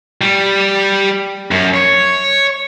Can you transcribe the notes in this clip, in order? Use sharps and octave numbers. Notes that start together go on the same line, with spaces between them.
G3
F#2
C#5